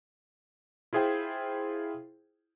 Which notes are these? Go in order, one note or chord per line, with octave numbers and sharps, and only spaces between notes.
E4 F4 G#4 C5 G5